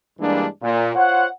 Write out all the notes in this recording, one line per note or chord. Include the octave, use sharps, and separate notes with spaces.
G2 E3 G3 G#3 A#3 D4
A#2
F4 C5 C#5 F#5